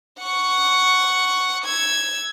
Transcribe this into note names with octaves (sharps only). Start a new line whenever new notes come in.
F#5 C#6
E6 G#6